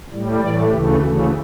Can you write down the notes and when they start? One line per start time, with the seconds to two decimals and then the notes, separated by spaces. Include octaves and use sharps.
0.11 A2 G3
0.39 A2 E3 A3 D5
0.69 D2 C#3 E3 A3 G4
0.98 D2 C#3 E3 A3 F#4